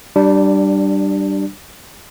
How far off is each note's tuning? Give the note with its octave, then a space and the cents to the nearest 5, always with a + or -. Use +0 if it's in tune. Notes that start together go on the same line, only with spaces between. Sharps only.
G3 -15 D4 +15